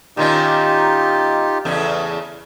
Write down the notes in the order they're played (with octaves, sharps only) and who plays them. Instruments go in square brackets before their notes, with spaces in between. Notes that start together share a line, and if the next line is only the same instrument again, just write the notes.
[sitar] A#2 D#3 C#4 [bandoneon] D#4 F4 G4
[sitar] E2 C#3 A3